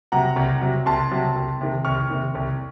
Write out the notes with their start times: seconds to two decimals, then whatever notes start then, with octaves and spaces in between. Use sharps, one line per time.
0.12 C3 F#3 F#5 A#5
0.36 C2
0.61 C3 F#3
0.86 C2 A5 C6
1.11 C3 F#3
1.36 C2
1.61 C3 D#3
1.85 C2 C#6 F6
2.10 C3 D#3
2.35 C2